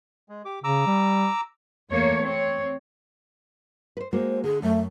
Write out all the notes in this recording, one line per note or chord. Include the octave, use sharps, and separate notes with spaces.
G#3
G4 D6
C#3 A#5 D6 E6
G3
E2 A3 A#3 C#5
C4 C#5
B4 C5
G#3 A#3 F#4 C5
D3 G#4
F#2 A3